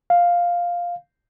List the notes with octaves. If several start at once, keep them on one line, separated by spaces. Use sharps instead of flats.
F5